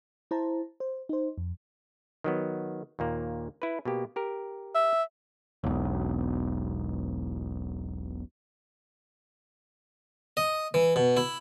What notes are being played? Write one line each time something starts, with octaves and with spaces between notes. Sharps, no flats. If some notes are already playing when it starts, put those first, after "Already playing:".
E4 C5 A5 A#5
C5
D#4 C5
F2
D#3 F#3 B3
D#2 A#2 A#3
E4 B4
B2 A#3 G4
G4 A#4
E5
E1 B1
D#5
E3
B2
E4